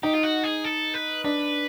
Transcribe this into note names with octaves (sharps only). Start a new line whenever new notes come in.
D#4 G4
F4
F#4
G#4
A4
B4
D4 B4